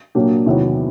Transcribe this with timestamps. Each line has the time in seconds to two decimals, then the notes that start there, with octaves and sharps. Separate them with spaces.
0.15 A#2 F#3 A#3 D4 G4
0.46 E2 C3 D#3 F#3 B3